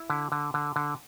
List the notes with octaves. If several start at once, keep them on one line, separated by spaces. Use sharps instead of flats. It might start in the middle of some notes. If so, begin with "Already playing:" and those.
Already playing: E4
D3
D3
D3
D3